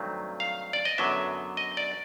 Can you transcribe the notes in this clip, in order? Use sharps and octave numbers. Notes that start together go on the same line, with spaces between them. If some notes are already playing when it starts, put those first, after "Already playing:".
Already playing: G2 D#3 F#3 A3 C4
F5
D5
D#5
F#2 D3 F#3 B3 D4 E5
D#5
D5